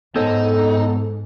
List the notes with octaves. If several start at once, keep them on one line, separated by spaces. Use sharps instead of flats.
G#2 B3 D#4 A4 C5 C#5